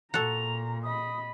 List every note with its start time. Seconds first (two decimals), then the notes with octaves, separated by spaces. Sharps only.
0.14 A#2 F#4 A4 A#5 F7
0.83 D#5 B5 D#6